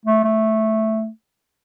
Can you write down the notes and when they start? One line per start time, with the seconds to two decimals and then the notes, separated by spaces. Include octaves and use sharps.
0.05 A3
0.24 A3